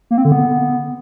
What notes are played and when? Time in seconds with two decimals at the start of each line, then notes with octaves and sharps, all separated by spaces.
0.11 A#3
0.18 C4
0.25 D3
0.32 B3